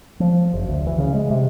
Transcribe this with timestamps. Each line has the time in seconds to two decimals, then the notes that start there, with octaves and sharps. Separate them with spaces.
0.20 F3
0.54 F#1
0.69 D2
0.87 E3
0.98 C#3
1.14 G#3
1.30 C3